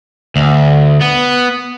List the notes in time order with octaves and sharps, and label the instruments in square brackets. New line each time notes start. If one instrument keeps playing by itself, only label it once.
[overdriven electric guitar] D2
B3